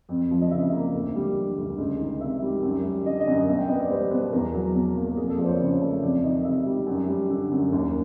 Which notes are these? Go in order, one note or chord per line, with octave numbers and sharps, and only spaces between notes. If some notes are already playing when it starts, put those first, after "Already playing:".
F2
F3
D#5
C#3 E5
A#3
D2
G3
D3
D2
C#2
D#3
C3 E5
G3
F#2
G3
D3 D#5
D#5
F#2
D#5
B2 E5
G5
B3 D#5
D5
G3 C5
B2 B4
E2 A#4
F#3
B2
A#3
F2 G#4
A4
F3 D5
C5
C#5
C#3 C#5
A3
F2 D5
D#3 D#5
C3 E5
G3
F#2
G3
D3
F#2
D#2